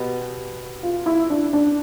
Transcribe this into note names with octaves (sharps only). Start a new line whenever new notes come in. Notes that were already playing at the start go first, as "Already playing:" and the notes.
Already playing: B2 B3 G4
F4
E4
D4
D4